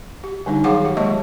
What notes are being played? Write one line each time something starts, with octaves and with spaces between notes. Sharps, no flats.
G4
D3 G3 D4 D#4
D#3 F#3 G#4 F5 F#5 D6
G4
F#3 G#3 A#3 D#5 A5 C#6